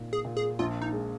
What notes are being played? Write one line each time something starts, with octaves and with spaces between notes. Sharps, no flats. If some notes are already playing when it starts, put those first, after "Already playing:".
Already playing: A#2 D#4
G#4
A#2
G#4
A#1 F4
D#4
G#3